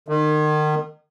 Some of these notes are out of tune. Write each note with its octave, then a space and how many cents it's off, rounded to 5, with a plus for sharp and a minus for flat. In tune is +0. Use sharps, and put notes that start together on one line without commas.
D#3 -35